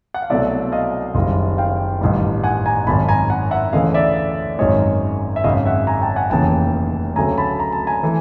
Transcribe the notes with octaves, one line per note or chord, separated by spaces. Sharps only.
F#5
F5
C2 B2 F#3 A3 D5 E5
D#5 F5
F#1 F#2 D#3 G3
F5 G5
A1 G2 D#3 G3
F#5 G#5
G#5 A#5
G#1 F#2 D#3 A5 B5
G#5 A#5
F#5 G#5
E5 F#5
D2 C#3 E3 A3 D#5 F5
D5 E5
G#1 F#2 D#3 G#3 C#5 D#5
E5
G#1 F#2 C#3 D#5 F5
E5 F#5
G#5 A#5
G5 A5
F#5 G#5
F1 D#2 C#3 E3 G5 A5
D2 C#3 F#3 A3 G#5 A#5
A5 B5
A#5
A5
G#5 A#5
E3 A3